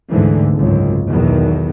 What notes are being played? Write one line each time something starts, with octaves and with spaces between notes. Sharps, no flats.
D2 G#2 D3 E3
G#1 C#2 F#2
B1 E2 B2 D#3